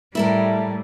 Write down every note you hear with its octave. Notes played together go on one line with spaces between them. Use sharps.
A2 G3 E4 A4 A#4